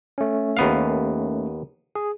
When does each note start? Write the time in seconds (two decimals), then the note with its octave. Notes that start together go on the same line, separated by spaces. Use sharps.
0.18 A3 C#4
0.57 D#2 B3 F5
1.95 G#4